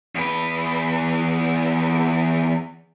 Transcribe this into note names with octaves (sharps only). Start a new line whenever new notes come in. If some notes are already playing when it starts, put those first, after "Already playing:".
E2 B4